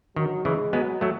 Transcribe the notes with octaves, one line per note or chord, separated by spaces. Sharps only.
D#3 F#3
C#3 E3 G#3
F#3 G#3 B3
F#3 A3